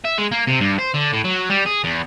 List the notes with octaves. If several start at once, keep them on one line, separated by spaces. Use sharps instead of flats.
E5
G#3
A#3
C3
G2
C5
D3
A2
F#3
G3
G#4
E2